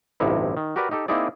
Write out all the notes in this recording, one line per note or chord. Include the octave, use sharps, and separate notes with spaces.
A1 D2 G2 C3 D#4 E4
D#3
F#4 G4 A#4 B4 D5
D#4 G4 A4
A#3 C4 D#4 E4 G#4 D5